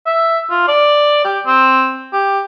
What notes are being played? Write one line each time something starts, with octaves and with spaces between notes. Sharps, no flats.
E5
F4
D5
G4
C4
G4